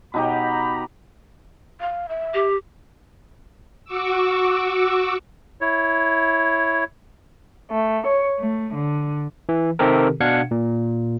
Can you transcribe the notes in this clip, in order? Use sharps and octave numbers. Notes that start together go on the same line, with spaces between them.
B2 D#4 G4 A#5 B5
F5
E5
G4
F#4 C#6 D6 E6
E4 C#5
A3
C#5
A3
D3
E3
C3 D#3 C4 G4 A4 A#4
B2 D4 F5 F#5 G#6 C#7
A#2